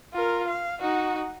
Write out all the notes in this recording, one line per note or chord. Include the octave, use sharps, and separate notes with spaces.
F4 A#4
F5
D#4 F#4